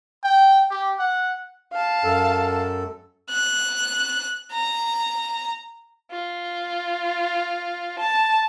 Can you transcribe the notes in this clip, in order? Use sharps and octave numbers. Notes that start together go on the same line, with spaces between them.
G5
G4
F#5
F5 A5
F#2 A4
F#6
A#5
F4
A5